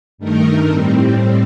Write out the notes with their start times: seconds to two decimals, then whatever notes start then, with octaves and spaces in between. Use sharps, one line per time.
0.18 G2 D#3 A3 D#4 A#4
0.67 A2 G3 C4